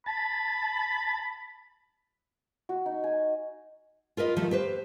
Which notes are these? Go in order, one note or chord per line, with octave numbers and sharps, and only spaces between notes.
A5 B5
F#4
D#4
G#5
F4 A#4 B4 D#5
D#3 F3 G3 A3
G4 B4 C5